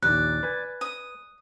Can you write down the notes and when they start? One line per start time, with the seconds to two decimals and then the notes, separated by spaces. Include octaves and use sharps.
0.03 A#1 D#2 D5 F#6
0.43 B4 G#5
0.81 D#6